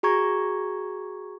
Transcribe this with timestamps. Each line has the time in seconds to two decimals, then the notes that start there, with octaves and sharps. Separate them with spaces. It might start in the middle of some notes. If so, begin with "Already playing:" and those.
0.03 F#4 G#4 A#5 C#6 G#6